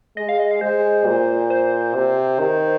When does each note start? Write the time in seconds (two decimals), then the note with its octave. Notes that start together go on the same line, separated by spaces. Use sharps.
0.17 G#3 D#5
0.29 F5
0.40 D#5
0.51 F5
0.61 G#3 C5
1.06 A#2
1.50 C5
1.95 C3
2.40 D#3